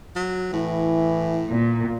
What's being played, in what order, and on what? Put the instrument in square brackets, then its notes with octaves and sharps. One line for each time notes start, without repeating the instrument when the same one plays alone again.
[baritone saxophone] F#3
[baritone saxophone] A2 [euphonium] E3
[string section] A#2